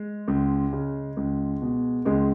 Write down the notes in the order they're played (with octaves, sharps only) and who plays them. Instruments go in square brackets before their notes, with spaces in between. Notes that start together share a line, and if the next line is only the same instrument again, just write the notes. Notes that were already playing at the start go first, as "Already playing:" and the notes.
Already playing: [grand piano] G#3
C#2
C#3
C#2
B2
C#2 G#3